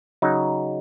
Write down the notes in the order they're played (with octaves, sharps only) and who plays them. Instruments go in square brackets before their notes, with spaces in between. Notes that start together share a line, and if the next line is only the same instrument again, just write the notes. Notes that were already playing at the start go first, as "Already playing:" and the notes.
[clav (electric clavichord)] C#3 F#3 D#4